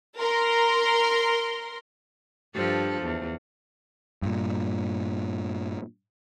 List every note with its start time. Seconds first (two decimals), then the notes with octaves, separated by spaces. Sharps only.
0.19 A#4 C6
2.54 G2 F3 A4
3.02 E2
4.22 G2 A#2